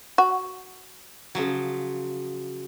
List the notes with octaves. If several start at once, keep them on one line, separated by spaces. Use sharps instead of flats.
F#4
C#3 F3 F#3